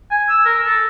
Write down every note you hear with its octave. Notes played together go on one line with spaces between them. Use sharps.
G#5
E6
A#4
A4